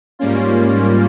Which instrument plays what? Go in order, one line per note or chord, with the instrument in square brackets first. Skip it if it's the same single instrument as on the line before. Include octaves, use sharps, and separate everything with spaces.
[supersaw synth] G#2 G3 A#3 C#4 F4